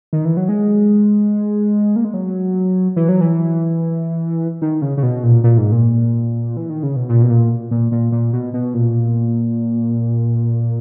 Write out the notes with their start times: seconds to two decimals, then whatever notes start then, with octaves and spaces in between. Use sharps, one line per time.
0.13 D#3
0.25 E3
0.37 F#3
0.49 G#3
1.96 A#3
2.05 G#3
2.14 F#3
2.96 E3
3.09 F#3
3.21 E3
4.62 D#3
4.82 C#3
4.97 C#3
5.03 B2
5.24 A#2
5.44 A#2
5.58 G#2
5.72 A#2
6.57 E3
6.70 D#3
6.83 C#3
6.96 B2
7.09 A#2
7.22 B2
7.30 A#2
7.71 A#2
7.92 A#2
8.12 A#2
8.33 B2
8.54 B2
8.74 A#2